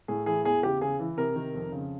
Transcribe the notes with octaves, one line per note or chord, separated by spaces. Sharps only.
A2 G#4
E3 G#4
E2 G#4
C#3 G4
C#3 G#4
E3
C3 A#4
D#3
F2
C#3